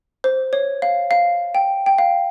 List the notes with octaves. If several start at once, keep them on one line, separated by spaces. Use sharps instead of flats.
C5
C#5
F5
F5
G5
G5
F5